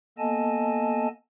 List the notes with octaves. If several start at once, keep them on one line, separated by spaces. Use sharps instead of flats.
A#3 B3 A4 D#5 G#5 A5